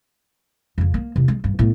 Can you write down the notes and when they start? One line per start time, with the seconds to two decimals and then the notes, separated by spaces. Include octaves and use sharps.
0.78 F2 C#3
0.94 A#3
1.16 E2 C3
1.28 G#3
1.44 G2
1.59 A2 B3